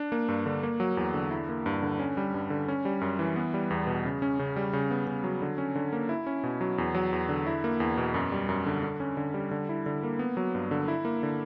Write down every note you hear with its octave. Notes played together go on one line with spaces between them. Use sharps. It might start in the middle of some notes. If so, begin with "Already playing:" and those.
Already playing: D4
A#3
G2
D3
A#3
F#3
E2
D3
E4
A#3
G2
D3
C#4
G3
G2
D3
C#4
G3
F#2
E3
B3
G3
E2
B2
C#3
C#4
C#3
G3
C#3
B3
C#3
F#3
D3
C#4
D3
A#3
E4
C#4
B2
F#3
E2
F#3
E2
D3
E4
A#3
E2
B2
F#2
G3
F#2
D3
D3
C#4
D3
G3
D3
E4
D3
A#3
B3
F#3
G2
D3
E4
A#3
D3